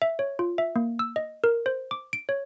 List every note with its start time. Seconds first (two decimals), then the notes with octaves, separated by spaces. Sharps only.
0.02 E5
0.19 C#5
0.39 F4
0.58 E5
0.76 A#3
0.99 E6
1.16 D#5
1.44 A#4
1.66 C5
1.91 D6
2.13 D7
2.29 C#5